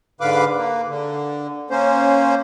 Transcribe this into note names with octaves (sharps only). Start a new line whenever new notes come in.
G#2 D3 B4 F5 D6
A#3
D3
A#3 C#4 C5